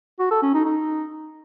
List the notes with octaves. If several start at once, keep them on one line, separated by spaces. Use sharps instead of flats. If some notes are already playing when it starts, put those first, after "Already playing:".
F#4
A4
C#4
D#4
D#4